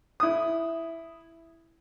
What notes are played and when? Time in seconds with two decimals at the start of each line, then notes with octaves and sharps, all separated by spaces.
0.20 E4 D#6